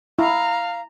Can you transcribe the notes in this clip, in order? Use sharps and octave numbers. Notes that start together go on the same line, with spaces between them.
E4 F5 A#5